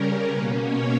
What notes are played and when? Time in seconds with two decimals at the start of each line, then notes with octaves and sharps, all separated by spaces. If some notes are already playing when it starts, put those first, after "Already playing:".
Already playing: C#3 G3 C#4 A#4
0.29 B2 A#3 C#4 B4
0.60 C#5